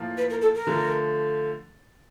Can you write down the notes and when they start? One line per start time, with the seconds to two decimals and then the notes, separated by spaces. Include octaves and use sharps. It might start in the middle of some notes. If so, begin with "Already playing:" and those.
Already playing: A2 F3 A#3
0.17 B4
0.30 A#4
0.42 A4
0.55 A#4
0.67 D3 F3 A3